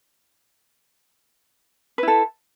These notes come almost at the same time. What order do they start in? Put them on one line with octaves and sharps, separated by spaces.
B4 E4 A4